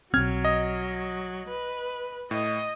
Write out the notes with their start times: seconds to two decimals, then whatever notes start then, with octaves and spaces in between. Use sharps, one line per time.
0.14 B1 F#3 C4 F6 G#6
0.45 D#5
1.49 B4
2.31 A2 D#5